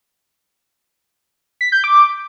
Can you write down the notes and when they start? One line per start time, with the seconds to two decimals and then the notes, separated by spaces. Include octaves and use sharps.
1.61 B6
1.72 G6
1.84 D6